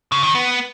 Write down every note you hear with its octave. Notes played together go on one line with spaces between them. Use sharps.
C#3
D#3
B3